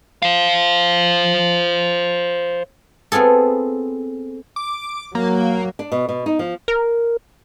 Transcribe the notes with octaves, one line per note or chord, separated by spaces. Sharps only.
C5 F5
B3 C4 F4 G#4 A4
D6
F#3 A#3
D4
B2
B2
D#4
F3
A#4